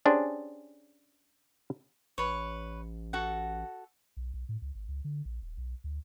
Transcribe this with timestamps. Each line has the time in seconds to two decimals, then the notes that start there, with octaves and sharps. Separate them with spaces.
0.05 C#4 D4 G4 G#4 C5
2.18 A1 B4 C#5
3.13 F#4 A4 F#5
4.17 B1
4.34 B1
4.49 A2
4.62 C#2
4.75 G#1
4.88 C#2
5.04 D3
5.25 A#1
5.42 D#1
5.58 B1
5.84 D2